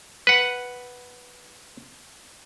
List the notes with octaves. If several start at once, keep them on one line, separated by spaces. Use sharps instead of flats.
B4 F#5